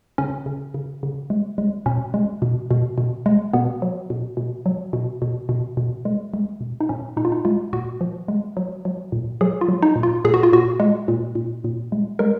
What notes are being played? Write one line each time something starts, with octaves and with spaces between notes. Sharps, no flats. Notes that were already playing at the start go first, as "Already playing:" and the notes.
C#3 C#4
C#3
C#3
C#3
G#3
G#3
B2 C#4
G#3
B2
B2
B2
G#3
B2 B3
F#3
B2
B2
F#3
B2
B2
B2
B2
G#3
G#3
B2
D#4
A#2 C#4
A#2 D#4
F4
D#4
G#3 F4
A#2 F#4
F3
G#3
F#3
F#3
A#2
F#3 G#4
F4
F#3
D#4
A#2
F4
A#2 G#4
F#4
F4
A#2 F#4
G#3
A#2
A#2
A#2
G#3
G#3 A#4